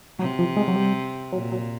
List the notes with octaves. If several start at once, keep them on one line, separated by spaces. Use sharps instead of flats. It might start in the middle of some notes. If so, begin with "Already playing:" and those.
C3 F#3
F3
G#3
F#3
G3
A#2 F#3
F#3